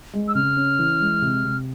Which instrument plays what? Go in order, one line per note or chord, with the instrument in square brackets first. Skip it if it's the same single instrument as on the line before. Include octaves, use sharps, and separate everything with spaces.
[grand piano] G#3
[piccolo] E6
[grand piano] C#3 [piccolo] F6
[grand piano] C#4
E3
G#3
C3
C3